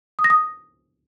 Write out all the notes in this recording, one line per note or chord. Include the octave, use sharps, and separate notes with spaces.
D#6
A#6
D#6